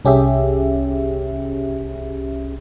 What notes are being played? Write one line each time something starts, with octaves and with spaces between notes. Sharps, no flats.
C2 C#4 G4 G#4 E5